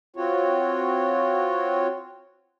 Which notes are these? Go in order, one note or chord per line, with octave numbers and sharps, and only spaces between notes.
C4 F4 F#4 C#5